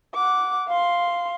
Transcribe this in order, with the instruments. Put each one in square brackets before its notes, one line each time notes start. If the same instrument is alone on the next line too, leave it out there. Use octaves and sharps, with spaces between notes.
[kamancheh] F#5 D6
F5 C6